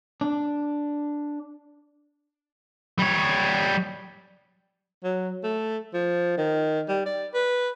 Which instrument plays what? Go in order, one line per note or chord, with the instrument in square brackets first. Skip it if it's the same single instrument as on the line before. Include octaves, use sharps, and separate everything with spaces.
[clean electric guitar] D4
[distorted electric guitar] G3 C#5
[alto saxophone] F#3
A3
F3
D#3
G3
D5
B4